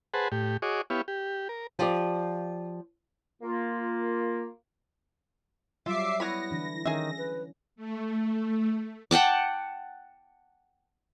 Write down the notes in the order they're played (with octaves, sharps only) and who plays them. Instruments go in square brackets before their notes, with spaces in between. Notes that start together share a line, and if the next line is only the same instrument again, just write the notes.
[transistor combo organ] G#4 B4 C5 F#5 A5
A2 G4
F#4 G#4 C#5 D#5 D6
B3 E4 G4 C#5 F5
G4
A#4
[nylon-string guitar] F3 G4 D5
[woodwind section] A#3 F4
[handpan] F#3 G3 [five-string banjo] F4 [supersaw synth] E5 D6 C7
[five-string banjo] B3 C#5 B5 [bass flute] E4 [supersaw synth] A#6
[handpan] D3 E3 D4
[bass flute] D#3 [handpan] C#4 [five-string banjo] G#4 E5
[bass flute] B4
[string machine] A3
[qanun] F#5 G5 A5 D6